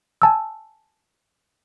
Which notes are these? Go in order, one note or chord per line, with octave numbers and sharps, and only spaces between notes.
G#5 A5 E6